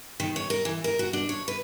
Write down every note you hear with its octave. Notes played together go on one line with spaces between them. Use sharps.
D#3
C#5
A#4
E3
A#4
F#4
D4
C#5
B4